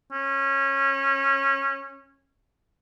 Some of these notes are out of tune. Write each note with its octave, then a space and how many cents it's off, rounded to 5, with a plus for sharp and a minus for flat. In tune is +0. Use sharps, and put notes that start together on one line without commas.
C#4 -20